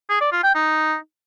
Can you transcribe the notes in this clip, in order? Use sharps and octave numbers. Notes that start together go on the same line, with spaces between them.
G#4
D5
F4
G5
D#4